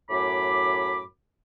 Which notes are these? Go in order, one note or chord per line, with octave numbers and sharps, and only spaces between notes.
F#2 A2 B5 D6